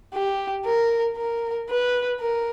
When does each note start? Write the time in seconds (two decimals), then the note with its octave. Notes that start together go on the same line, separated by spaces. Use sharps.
0.14 G4
0.65 A#4
1.18 A#4
1.69 B4
2.21 A#4